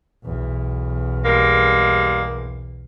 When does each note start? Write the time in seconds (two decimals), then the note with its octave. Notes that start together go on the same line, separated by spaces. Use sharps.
0.24 B1 E2
1.25 G3 G#3 A#3